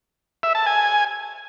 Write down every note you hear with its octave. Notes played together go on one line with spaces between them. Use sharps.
E5
A5
G#5